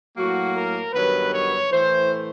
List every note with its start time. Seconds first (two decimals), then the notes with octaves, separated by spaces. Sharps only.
0.16 A2 F#3 A#3 F#4
0.56 A#4
0.93 G2 D#3 F#3 B3 B4
1.33 C#5
1.71 A2 E3 A3 C5